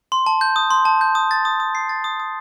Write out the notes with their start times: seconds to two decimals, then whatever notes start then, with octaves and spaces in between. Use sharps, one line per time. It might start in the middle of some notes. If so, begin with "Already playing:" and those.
0.12 C6
0.26 A5
0.41 G6
0.56 D#6
0.70 C6
0.85 A5
1.01 G6
1.15 D#6
1.31 A6
1.45 D#6
1.60 D#6
1.75 C7
1.89 A6
2.04 D#6
2.20 D#6